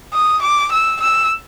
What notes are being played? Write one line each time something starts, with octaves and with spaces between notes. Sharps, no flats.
D#6
D6
E6
E6